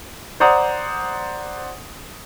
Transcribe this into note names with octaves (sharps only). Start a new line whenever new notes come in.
C5 D5 F#5 A#5 D#6